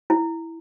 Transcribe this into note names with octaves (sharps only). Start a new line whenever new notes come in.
E4